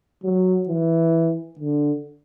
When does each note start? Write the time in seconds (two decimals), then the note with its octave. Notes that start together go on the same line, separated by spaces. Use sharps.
0.24 F#3
0.69 E3
1.59 D3